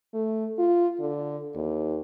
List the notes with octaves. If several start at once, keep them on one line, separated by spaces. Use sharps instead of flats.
A3
F4
D3
D#2